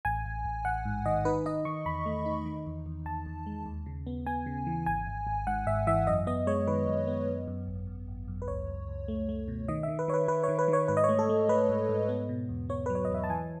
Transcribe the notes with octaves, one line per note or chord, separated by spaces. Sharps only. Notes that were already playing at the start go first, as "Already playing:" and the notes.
A1 G#5
A1
A1
A1 F#5
G#2
D#3 D#5
D#4 B4
D#4 D#5
D#3 C#6
E2 B5
A3
D#4
D#3
E2
E2
E2 A5
E2
G#3
D#2
C#3
B3
B3 G#5
C#3
E3
G#1 G#5
G#1
G#1
G#2 F#5
G#1 E5
E3 E5
F#2 D#5
B3 D#5
G#3 C#5
D#3 B4
F#2
B3
F#2
F#2
G#1
F#2
G#1
F#2
B4
C#2 C#5
C#2
C#2
A3
A3
B2
D#3 D#5
E5
D#3
B4
D#3 C#5
B4
D#3 B4
C#5
D#3
B4
D#3
C#5
G#2 B4
D#5
C#5
A3
A4
A3
A3 B4
G#2
G#2
B3
B2
E2
B3 C#5
F#3 B4
C#5
D#5
E2 E5
A5
E3 G#5